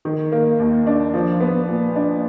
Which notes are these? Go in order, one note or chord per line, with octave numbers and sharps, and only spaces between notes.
D#3
A#3
D#2
D4
F3
B3
A#2
D4